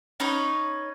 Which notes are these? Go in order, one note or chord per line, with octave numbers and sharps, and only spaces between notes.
C#4 D#4 B4 C#5